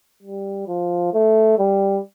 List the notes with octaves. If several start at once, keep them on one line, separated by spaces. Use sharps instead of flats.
G3
F3
A3
G3